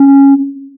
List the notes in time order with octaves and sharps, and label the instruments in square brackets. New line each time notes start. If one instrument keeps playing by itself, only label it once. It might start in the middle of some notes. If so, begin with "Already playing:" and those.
Already playing: [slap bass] C#4